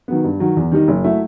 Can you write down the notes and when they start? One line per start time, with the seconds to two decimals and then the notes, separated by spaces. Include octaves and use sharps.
0.08 D#3 F#3 B3
0.24 G2
0.40 D#3 F#3
0.57 E2
0.72 D#3 G3 D#4
0.88 F#1
1.04 F#3 A3 E4